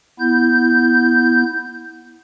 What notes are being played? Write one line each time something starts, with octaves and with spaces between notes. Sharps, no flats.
B3 E4 G6